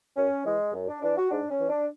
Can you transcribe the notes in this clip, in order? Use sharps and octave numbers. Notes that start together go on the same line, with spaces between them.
F#2 C#4
E3 G#3
F#2
D4
E3 D4
F#4
G#2 D4
C#4
E3
D4